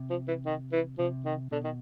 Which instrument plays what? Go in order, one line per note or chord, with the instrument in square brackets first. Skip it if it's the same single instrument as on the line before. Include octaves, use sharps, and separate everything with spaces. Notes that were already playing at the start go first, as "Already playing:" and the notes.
Already playing: [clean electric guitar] C3
[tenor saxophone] F3
E3
D#3
E3
[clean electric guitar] C3 [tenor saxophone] F3
[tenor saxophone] D#3
[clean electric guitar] B2 [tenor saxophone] D3
[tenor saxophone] D#3